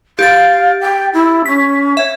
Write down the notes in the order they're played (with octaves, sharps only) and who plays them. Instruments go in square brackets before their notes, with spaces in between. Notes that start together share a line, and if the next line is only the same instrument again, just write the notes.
[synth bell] G4 A6 [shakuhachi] F5
[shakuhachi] G5
E4
[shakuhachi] C#4 [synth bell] B6
[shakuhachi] C#5 [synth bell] E5